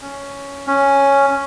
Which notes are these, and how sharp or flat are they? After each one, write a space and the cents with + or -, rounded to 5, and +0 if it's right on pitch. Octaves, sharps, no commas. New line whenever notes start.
C#4 +5
C#4 +0